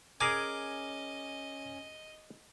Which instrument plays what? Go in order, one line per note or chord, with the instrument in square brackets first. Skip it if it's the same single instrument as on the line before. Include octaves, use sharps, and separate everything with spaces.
[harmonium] C#4 [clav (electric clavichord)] G#4 A#4 G#5 [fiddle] D#5 [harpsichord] D6